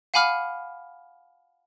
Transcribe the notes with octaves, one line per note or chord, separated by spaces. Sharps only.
F5 F#5 G#5 B5 D6 F6